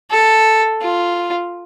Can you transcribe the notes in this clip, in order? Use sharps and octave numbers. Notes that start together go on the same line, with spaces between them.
A4
F4